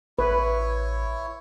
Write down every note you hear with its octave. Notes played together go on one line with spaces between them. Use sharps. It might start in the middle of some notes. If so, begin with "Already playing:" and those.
A1 E4 B4 C#5